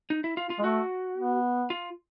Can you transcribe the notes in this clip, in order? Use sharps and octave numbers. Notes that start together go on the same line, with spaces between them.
D#4
E4
F4
F4
G#3
A3 F#4
B3
F4